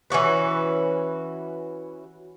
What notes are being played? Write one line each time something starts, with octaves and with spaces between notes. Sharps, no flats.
E3 C#4 F#4 B4